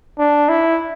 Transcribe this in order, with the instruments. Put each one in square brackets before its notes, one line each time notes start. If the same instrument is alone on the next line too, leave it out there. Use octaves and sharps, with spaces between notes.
[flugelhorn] D4
E4